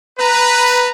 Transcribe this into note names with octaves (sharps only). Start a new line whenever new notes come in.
B4 A#5